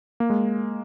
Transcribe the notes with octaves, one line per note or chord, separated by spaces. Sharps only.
A#3
G#3